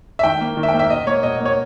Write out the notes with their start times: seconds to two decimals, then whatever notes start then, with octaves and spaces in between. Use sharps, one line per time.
0.19 E5
0.23 D#3 G5
0.41 A#3
0.57 D#3
0.63 E5
0.69 G5
0.74 A#3
0.79 E5
0.90 B2 D#5
1.06 A#3 C#5
1.23 B2 D#5
1.40 A#3
1.46 C#5